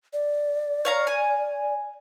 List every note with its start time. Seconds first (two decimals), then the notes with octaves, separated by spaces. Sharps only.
0.13 D5
0.85 C#5 F5 A#5
1.07 G#5